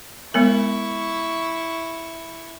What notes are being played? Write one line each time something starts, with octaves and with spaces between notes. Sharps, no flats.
G#3 B3 E4 A#4 C#6